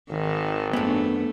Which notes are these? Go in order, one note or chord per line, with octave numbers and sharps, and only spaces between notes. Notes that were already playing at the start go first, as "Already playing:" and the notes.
G#1 D#3
F#2 A3 B3 D4